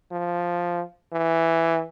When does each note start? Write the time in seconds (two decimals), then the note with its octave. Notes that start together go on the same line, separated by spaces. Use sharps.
0.12 F3
1.13 E3